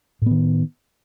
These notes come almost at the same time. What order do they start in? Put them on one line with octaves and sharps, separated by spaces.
A2 B3 D#3